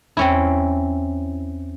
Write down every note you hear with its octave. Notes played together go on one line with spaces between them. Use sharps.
E2 C4 C#4 E4